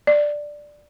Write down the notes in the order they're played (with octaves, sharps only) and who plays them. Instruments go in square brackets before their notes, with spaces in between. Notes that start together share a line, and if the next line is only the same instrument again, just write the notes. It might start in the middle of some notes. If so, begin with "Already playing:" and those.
[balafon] D5